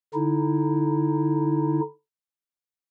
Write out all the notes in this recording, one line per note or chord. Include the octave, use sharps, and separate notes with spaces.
D3 D#4 E4